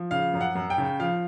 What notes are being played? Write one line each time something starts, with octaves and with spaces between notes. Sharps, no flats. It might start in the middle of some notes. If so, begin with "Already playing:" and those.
Already playing: F3
C#3 F5
F#2
F#5
F#2
G5
C#3
F3 F5